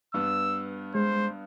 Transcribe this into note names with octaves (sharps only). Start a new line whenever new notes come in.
G2 B3 E6
G#3 C5